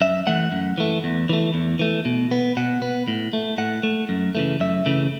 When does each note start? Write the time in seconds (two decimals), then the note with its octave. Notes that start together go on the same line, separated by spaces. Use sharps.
0.01 F#2 E5
0.27 E3 A3 F#5
0.52 F#2
0.78 E3 A3
1.04 E2
1.29 E3 A3
1.54 E2
1.79 E3 A3
2.05 B2
2.31 B3
2.57 B2 F#5
2.82 B3
3.08 A2
3.33 A3
3.58 A2 F#5
3.83 A3
4.09 F#2
4.35 C#3 E3 A3
4.60 F#2 E5
4.86 C#3 E3 A3